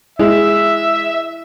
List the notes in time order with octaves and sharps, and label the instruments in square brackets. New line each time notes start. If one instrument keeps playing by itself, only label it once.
[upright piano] G#3 [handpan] E4 [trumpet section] E5